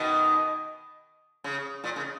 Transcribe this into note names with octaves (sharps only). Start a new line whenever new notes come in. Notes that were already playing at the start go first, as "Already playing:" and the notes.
Already playing: B2 D#3
C#3
A#2
C#3